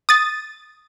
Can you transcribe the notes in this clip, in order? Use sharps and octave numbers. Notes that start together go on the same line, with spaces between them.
D#6 A6